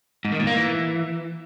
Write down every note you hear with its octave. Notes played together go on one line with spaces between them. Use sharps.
G#2
D#3
A#2
A#3
E3